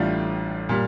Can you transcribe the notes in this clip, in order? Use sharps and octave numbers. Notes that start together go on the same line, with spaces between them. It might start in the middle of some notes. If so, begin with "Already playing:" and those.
Already playing: A1 A2 G3 D4 F4
A#2 G3